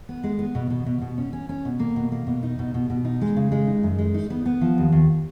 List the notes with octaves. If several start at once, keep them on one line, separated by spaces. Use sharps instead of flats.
B3
G#3
B3
B2
B2
B2
B2
C#4
C#4
C#4
B2
A#3
B2
A#3
B2
D#4
B2
B2
B2
D#4
G#3
C#3
G#3
D#4
F#2
G#3
D#4
B3
B3
F3
D#2
D#2